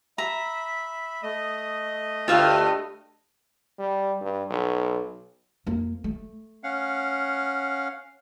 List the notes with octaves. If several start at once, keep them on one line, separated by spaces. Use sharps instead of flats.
E5 A#5 B5
A3 D#5 D#6
D2 G2 F4 E5 F5 G5
G3
G2
B1
F2 A#3
A3
C#4 F5 F#5